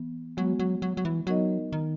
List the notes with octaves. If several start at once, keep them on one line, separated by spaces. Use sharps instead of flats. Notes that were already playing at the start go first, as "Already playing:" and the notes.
Already playing: E3 B3
F#3 G#3 B3 F#4
F#3
F#3
F#3
E3
F#3 B3 D#4 A#4 D#5
D#3